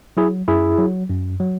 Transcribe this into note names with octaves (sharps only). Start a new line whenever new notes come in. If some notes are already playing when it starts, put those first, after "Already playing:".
F#3 E4 G#4
F#2 E4 G#4
F#3
F#2
F#3